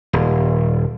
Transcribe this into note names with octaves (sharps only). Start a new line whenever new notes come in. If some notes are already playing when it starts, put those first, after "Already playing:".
D#1